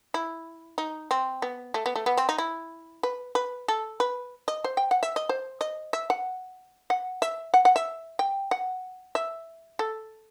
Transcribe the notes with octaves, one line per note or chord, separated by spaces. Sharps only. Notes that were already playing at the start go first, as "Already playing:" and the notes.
E4
D#4
C4
B3
A3
B3
A3
B3
C4
D#4
E4
B4
B4
A4
B4
D#5
C5
G5
F#5
E5
D#5
C5
D#5
E5
F#5
F#5
E5
F#5
F#5
E5
G5
F#5
E5
A4